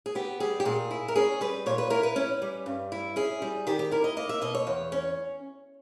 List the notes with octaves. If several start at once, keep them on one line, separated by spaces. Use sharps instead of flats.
G#4
B3 G4
G3 G#4
G4
A#2 G#4
E4
A#4
C#4 G#4
G3 B4
A#2 C#5
B4
E4 A#4
B4
C#4
G3
G2
E4
C#4 G#4
G3
D#3 G4
G4
E4 A#4
D#5
A#3 D#5
E5
B2 D#5
C#5
E2
C#4